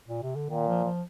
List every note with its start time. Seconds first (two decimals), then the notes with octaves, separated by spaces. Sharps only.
0.08 A#2
0.23 C3
0.36 D3
0.50 A#2 D#3
0.68 F3
0.84 F3